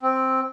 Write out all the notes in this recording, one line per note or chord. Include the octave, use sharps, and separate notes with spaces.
C4